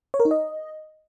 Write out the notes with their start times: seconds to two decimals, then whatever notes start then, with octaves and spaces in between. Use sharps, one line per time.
0.14 C#5
0.20 A#4
0.25 D#4
0.31 D#5